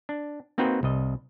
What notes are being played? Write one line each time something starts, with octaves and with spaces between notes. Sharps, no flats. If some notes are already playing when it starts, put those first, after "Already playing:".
D4
A#3 C4 D#4 F#4 B4 G5
C2 D#5